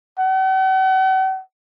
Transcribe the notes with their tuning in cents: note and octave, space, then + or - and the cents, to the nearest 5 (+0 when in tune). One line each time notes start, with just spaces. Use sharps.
F#5 +45